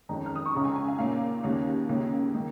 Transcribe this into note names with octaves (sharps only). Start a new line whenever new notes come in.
F2 D#3 G#3 C#4 A#5
F6
D#6
C#6
C#2 C#3 G#3 C#4 A#5
G#5
G#5
F5
A#2 A#3 C#4 F5
D#2 C#3 A#3 C#4
C#2 C#3 A#3 C#4
D#3 A#3